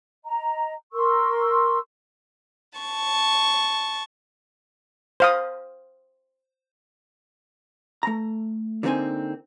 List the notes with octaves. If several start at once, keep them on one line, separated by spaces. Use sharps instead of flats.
D#5 A#5
A#4 C6 C#6 E6
A5 C#6
C5 F5 D#6
A3 A#5
D3 F#3 A#3 C4 D#4 G#5